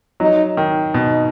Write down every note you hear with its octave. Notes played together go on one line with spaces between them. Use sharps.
F#3 D#4
D#3
B2 D#4